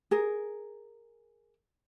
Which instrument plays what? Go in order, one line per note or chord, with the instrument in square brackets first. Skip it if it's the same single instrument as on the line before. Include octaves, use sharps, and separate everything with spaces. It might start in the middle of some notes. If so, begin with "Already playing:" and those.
[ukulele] G#4 A#4